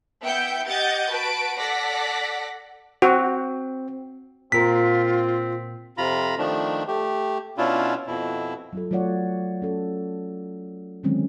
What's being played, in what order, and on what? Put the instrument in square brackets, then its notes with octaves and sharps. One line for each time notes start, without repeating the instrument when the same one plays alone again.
[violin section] B3 E4 E5 G5 G6 C#7
G4 D#5 F#5 G6 A6 C#7
F#4 B4 A5 D7
A4 D5 F#5 A#6 B6
[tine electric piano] C4 [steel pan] F#4
[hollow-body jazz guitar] A#2 A#4 [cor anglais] C4 [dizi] F4 [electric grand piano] B6
[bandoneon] F2 C3 F4 A#5 B5
D#3 F3 A3 D4
A3 G4
B2 C#4 D4 E4 F4
F2 B2 E4
[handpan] F#3 F4 A4
F#3 A3 F4 C#5 D5 F#5
C#4 A4
D3 D#3 F#3 G#3 C4 C#4